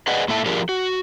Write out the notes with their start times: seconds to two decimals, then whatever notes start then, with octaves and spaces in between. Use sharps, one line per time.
0.07 G#4 B4 D5 D#5 F#5
0.28 A2 A#3 E4 A4 E5 A5
0.46 F3 D4 F4 G4 G#4 A#4
0.69 F#4